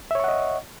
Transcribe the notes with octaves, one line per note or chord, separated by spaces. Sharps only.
C#5 D#5 E5 F#5 C#6